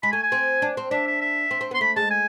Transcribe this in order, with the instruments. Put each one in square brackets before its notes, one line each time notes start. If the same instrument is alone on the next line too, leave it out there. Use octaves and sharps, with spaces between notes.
[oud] G#3 [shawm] B5
[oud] A3 [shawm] G#5
[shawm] G#5
[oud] C4
D4
C4
[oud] D4 [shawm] E5
[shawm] E5
E5
[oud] C4
C4
[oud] B3 [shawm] C6
[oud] A3 [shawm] B5
[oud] G#3 [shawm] A5
[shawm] G#5